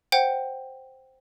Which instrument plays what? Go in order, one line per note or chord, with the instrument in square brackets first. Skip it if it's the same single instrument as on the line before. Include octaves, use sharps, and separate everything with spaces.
[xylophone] C5 F#5 G5